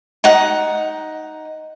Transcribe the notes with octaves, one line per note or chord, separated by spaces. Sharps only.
D#4 F#5